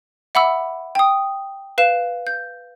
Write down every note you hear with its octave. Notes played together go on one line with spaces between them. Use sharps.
E5 F#5 B5 D6 E6
G5 D#6
B4 F5 C7 E7
G6